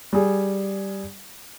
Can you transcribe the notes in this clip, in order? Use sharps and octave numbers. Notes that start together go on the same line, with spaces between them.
G3 G#4